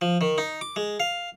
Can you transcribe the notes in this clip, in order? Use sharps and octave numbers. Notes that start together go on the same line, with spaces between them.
F3
D#3
D#4
D6
G#3
F5